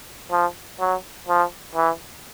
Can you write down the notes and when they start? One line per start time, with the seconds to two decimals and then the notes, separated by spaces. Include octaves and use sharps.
0.31 F3
0.80 F#3
1.28 F3
1.75 E3